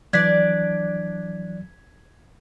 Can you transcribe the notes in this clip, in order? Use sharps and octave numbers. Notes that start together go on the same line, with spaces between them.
E3 F#3 D4 D5 G#6 B6